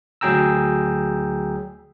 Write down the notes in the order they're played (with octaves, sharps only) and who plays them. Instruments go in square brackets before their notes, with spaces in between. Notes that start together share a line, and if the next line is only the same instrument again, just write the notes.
[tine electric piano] D2 F#3 G#4 G5 A#5 E6